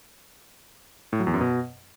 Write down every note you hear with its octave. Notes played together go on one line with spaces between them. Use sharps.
A2
F#3
E2
F#2
B2